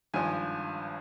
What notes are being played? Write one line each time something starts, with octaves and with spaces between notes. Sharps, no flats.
G#1 G2 F3 G#5